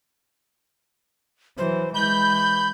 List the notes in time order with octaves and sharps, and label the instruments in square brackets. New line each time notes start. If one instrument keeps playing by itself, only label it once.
[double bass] E3 F#3 [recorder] C5
[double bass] E3 G#3 [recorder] B5 [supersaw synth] G6